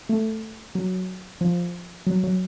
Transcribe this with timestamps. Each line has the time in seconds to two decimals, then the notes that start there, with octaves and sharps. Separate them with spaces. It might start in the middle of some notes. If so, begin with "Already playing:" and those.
0.09 A3
0.75 F#3
1.41 F3
2.07 F#3
2.24 F#3